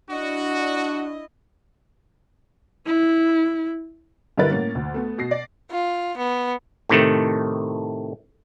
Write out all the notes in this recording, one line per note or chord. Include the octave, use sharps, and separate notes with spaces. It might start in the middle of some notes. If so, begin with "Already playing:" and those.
D4 E4 F#4 D#5
E4
G2 D3 E4 A#4 B4 A6
A2 A#3 C#4
D2
A3 B3
B2 A#6 C7
D5
F4
B3
A2 C3 D#3 A3